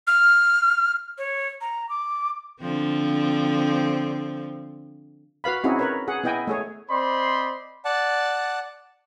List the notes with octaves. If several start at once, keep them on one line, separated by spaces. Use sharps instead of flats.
F6
C#5
A#5
D6
D3 F3 C4
F#4 B4 F5 B5
C4 C#4 D#4 E4 F#4 G#4
A#4 B4 C#5
G#4 F#5
B3 E4 D#5 G5 G#5
A3 G#4 C#5
C4 C5 D5 D#5 B5 C6
D5 F#5 A5